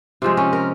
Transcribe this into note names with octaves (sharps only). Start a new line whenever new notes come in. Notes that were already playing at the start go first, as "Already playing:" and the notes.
C3 F3 G#3
C#4
A#4